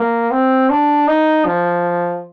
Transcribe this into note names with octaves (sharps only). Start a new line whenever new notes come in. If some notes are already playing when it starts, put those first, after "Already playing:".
Already playing: A#3
C4
D4
D#4
F3